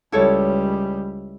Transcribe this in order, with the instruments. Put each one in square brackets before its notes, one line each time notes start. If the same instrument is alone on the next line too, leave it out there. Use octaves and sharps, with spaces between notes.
[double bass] C#2 G3 [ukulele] E4 A4 C#5